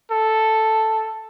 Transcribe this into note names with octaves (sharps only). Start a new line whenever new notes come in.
A4